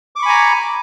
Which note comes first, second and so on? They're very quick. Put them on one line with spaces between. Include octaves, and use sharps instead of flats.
D6 C#6 B5 G#5 A#5